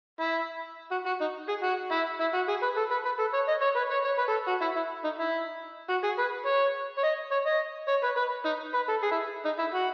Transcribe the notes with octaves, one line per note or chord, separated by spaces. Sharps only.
E4
F#4
F#4
D#4
G#4
F#4
E4
E4
F#4
G#4
B4
A4
B4
B4
A4
C#5
D#5
C#5
B4
C#5
C#5
B4
A4
F#4
E4
E4
D#4
E4
F#4
G#4
B4
C#5
C#5
D#5
C#5
D#5
C#5
B4
B4
D#4
B4
A4
G#4
E4
D#4
E4
F#4